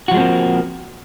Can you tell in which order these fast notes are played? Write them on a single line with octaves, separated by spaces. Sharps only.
F#4 F3 G#3 C4 A#3